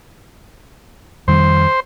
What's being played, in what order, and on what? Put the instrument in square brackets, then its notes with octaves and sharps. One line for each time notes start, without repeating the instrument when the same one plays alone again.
[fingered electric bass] F2 D#3 G3 [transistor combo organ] C5